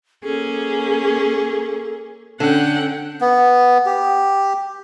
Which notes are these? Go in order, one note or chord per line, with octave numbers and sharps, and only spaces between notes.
A#3 C#4 G#4 A4
D3 C#4 F#5 G5
B3
G4